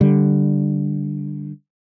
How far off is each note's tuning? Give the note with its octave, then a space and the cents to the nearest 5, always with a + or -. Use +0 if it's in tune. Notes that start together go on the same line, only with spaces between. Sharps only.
D3 +0 G3 +0